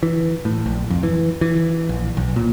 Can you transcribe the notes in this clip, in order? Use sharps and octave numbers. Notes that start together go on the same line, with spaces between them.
E3
A2
A#1
F2
E3
E3
A#1
B1
A#2